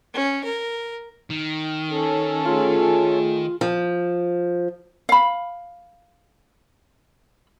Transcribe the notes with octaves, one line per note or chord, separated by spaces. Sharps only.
C#4
A#4
D#3
C#4 A4
A3 F4 G#4
F3
F5 B5